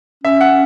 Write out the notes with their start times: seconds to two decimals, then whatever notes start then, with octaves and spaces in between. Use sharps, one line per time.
0.24 C#4 E5
0.41 F#5